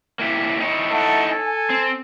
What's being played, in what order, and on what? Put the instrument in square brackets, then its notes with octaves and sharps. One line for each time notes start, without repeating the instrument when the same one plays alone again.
[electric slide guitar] A#3 E4 G4
D#4 E4 C#5
[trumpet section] A3 F#5 A5
A4 G#5
[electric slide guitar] C4